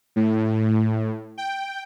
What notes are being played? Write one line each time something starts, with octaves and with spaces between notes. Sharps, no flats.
A2
G5